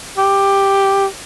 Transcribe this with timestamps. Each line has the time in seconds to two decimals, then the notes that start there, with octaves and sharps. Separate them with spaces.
0.18 G4